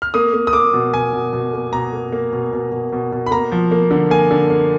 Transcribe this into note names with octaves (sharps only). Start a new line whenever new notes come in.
F6
A#3 D#6
A#3
D#6
A#3 D6
B2
B2 G#5
B2
B2
A#3
B2 A#5
A#3
A#3
B2
B2
B2
B2
B2
B5
A#3 A#5
F3
A#3
D3
A#3 G#5
D3
A#3